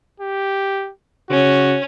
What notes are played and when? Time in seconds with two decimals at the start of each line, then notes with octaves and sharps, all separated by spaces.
0.20 G4
1.30 C#3 C#4 F#4